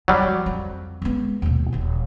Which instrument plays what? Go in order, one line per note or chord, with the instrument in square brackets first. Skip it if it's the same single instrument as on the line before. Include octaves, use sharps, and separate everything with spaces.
[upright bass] F2 [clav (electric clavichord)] F#3 G3
[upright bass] F3
F2
G#3 B3
D#2 B2
D#1 E3